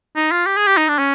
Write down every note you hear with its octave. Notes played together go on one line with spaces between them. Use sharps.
D#4
F4
G4
G#4
G4
D#4
D4
C#4